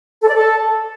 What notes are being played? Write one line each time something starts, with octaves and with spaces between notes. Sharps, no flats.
A4
D5
A4